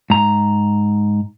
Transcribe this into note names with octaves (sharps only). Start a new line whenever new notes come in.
G#2 A#5